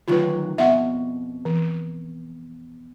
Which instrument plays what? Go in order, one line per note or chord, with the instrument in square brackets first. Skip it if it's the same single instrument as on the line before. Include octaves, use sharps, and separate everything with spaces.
[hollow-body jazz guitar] D2 D#3 F#3 [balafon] F4 B4
[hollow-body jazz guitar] F2 B2 [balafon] E5 F#5
[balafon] E3